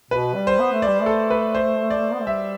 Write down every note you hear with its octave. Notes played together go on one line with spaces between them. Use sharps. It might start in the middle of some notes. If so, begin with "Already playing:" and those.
B2 B4
G3
C5
B3
A3
G3 D5
A3
A4
B4
C5
D5
B3
A3
G3 E5